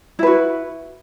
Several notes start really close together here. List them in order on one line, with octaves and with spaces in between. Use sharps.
E4 B4 F#4